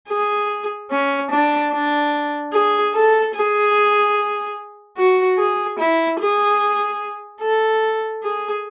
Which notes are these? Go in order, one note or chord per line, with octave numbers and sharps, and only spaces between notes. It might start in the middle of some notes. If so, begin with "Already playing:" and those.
G#4
C#4
D4
D4
G#4
A4
G#4
F#4
G#4
E4
G#4
A4
G#4